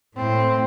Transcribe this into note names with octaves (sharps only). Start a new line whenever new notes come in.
A2 C4